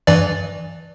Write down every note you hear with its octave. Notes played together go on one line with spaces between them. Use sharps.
G2 E3 D5